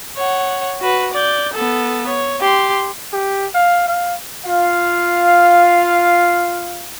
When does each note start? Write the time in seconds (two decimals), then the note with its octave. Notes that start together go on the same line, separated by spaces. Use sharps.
0.17 C#5 F#5
0.81 F#4 B4
1.14 D5 G6
1.54 B3 A4
2.07 C#5
2.41 G4 C6
3.13 G4
3.55 F5
3.88 F5
4.45 F4 F5